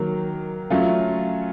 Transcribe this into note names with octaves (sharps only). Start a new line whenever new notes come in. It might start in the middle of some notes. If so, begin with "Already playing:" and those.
Already playing: D#3 F#3 A#3
F#3 A3 C#4 F4